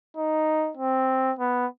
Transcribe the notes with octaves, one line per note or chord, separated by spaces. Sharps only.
D#4
C4
B3